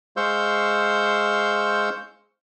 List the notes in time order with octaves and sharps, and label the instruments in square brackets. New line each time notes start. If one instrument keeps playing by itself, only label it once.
[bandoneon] G#3 C5 F5 C#6 E6 G6